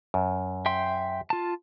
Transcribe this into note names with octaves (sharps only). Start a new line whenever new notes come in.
F#2
E5 G5 C6
F4 A5